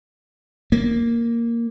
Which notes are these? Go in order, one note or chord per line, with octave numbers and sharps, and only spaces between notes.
A#3